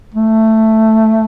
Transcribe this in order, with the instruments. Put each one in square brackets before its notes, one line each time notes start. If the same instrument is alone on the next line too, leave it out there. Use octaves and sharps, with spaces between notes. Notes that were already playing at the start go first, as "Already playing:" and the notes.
[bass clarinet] A3